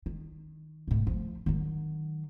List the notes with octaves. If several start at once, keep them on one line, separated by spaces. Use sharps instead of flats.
D#3
B1 A2
F3 A3
D#3 F#3